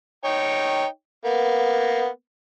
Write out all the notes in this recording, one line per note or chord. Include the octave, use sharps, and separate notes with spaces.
D#4 C#5 G5
A#3 B3